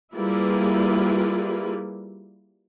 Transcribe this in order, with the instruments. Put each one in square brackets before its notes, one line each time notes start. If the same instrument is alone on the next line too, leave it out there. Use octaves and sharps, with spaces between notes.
[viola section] G3 A#3 E4 F4 G#4 B4